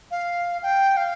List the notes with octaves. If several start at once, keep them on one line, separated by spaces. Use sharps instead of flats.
F5
G5
F5